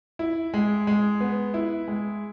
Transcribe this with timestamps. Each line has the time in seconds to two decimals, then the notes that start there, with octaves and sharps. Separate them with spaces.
0.19 E4
0.54 G#3
0.87 G#3
1.20 B3
1.54 E4
1.88 G#3